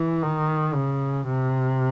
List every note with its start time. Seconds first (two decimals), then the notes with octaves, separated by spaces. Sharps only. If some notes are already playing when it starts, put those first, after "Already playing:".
Already playing: E3
0.23 D#3
0.75 C#3
1.27 C3